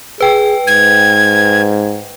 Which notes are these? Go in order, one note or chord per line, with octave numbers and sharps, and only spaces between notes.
G#4 B4 G5
G#2 G#6